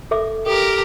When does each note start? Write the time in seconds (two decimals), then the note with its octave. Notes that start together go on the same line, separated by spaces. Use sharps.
0.11 A4 E5 D6
0.46 G4 A4 A#4